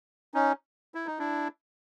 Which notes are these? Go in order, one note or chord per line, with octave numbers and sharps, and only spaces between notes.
C#4 D#4
E4
D#4
D4 E4